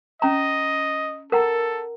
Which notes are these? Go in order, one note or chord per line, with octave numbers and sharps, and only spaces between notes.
C#4 D#5 A#5
A4 A#4 F#5 A#5